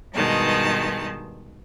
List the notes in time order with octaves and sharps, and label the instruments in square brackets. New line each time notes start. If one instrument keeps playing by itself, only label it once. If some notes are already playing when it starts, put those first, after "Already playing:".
[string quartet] G2 B2 D#3 G#3 A5